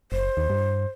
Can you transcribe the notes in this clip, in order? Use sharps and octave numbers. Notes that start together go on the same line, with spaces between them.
F#1 C5
D#2
G2